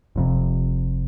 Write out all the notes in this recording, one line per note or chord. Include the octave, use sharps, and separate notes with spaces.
F1 F2 C3